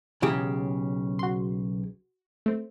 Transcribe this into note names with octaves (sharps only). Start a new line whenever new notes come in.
B1 C#3 E3 G4 G#4
F#4 C6
A3 C4